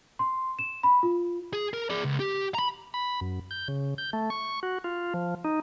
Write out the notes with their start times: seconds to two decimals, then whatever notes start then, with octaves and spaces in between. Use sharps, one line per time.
0.19 C6
0.59 E7
0.83 B5
1.03 F4
1.53 G#4
1.73 A#4
1.90 G#4 D5
2.05 C#2
2.20 G4
2.55 A#5 B5
2.94 B5
3.21 F#2
3.51 G6
3.68 C#3
3.98 G6
4.13 A3
4.30 C#6
4.63 F#4
4.84 F4
5.14 F3
5.44 D#4